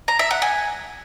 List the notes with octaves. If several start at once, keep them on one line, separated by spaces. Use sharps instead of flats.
A#5
E5
F#5
G#5